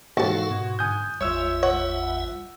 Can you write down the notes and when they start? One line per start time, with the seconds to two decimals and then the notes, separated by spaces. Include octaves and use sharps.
0.17 D#2 G#2 E3 F#4 A4 F5 A5
0.50 G#2 B2
0.79 G1 G#5 D#6 F#6 G6
1.21 G#1 E2 G3 F4 C#5 E5 E6
1.63 C#5 F#5